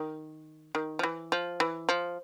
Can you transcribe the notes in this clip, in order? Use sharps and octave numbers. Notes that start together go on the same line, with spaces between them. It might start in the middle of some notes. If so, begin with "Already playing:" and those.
Already playing: D#3
D#3
F3
E3
F3
E3
F3